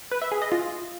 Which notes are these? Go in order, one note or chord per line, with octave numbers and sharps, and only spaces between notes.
B4
E5
G#4
D#5
F4